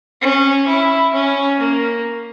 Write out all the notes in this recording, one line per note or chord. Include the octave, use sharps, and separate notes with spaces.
C#4
E4
C#4
A#3